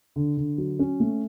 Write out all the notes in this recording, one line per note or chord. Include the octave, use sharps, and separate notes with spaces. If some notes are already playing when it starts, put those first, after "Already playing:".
D3
D3
F#3
C#4
A3